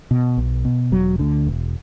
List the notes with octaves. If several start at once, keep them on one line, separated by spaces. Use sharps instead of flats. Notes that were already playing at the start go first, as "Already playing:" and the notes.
B2
B1
B2
E1 F#3
D2 D3
E1